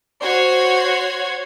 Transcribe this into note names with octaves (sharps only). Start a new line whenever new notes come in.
F#4 C5 C#5 G#6